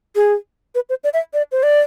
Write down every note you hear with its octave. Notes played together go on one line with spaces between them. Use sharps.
G#4
B4
C5
D5
E5
D5
C5
D5